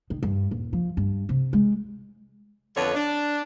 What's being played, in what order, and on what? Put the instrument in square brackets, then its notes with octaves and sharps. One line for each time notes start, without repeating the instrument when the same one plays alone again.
[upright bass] D#3
G2
D#1
F3
G2
C3
G#3
[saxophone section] F2 D3 B3 D4 C#5
D4